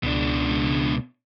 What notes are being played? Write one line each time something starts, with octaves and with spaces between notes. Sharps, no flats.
C#2 B2 D4